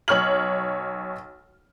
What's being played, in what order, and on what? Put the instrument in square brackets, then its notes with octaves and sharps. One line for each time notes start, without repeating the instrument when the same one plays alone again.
[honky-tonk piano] B1 C#5 F6 F#7